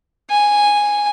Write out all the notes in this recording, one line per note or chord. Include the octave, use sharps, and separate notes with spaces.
G#5